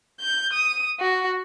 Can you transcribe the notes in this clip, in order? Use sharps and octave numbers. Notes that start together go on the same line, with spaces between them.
G6
D#6
F#4